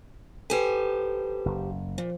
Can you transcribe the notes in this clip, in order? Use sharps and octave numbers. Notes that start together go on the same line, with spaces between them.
G4 A4 B4 C5 G#5
F#1
A#2 F3